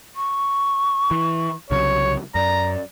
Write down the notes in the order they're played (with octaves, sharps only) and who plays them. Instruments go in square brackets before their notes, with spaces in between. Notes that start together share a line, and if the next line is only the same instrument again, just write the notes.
[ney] C#6
[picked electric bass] E3
[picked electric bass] C2 C#3 F#3 [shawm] C#5
[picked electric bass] F#2 [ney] D5 [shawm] A#5